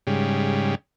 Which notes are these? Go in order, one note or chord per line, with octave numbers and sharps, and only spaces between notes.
G#2 C#3 G3